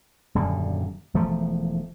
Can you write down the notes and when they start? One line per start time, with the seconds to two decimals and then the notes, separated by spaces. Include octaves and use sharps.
0.35 D#1 F#2 D3 G3
1.14 E1 E3 F3 A3